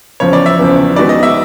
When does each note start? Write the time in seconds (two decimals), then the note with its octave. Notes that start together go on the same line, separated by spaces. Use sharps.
0.20 E2 C#3 F3 C#5
0.33 D5
0.46 E5
0.59 E2 C#3 F3
0.96 D#3 G#3 B3 D#4 F#4 D5
1.09 D#5
1.23 E5